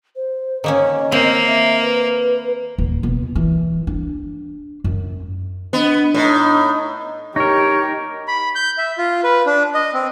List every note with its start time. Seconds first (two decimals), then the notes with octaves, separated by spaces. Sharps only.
0.16 C5
0.64 D#3 A#3 C#4 D#5
1.12 A#3 C4
1.47 E5
1.83 B4
2.78 D#1
3.03 B2
3.35 E3
3.87 D4
4.84 F#2
5.73 B3 D4 D#5
6.14 A2 D#4
7.36 D#4 G4 A#4 C#5
8.28 B5
8.55 G6
8.78 E5
8.98 F4
9.24 B4
9.46 D4
9.74 D#5
9.94 C4